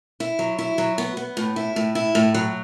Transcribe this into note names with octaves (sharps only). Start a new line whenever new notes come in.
E4
F#3
E4
F#3
B3
B3
A2
E4
A2
E4
A2
F#3